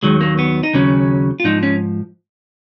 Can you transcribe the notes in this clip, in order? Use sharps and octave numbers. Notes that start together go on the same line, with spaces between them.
D#2 D#3 F#3 G#3
A#3
B3
D#4
D#2 C#3 F#3 C#4
F4
G#2 F3 D#4
C#4